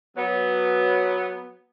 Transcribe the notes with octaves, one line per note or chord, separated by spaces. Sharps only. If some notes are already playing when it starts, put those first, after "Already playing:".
F#3 B3